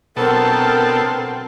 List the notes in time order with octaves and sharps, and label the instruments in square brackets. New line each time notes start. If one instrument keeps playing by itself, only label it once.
[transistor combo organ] B2 A4 [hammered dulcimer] D3 F#3 [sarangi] C4 [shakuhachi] A#4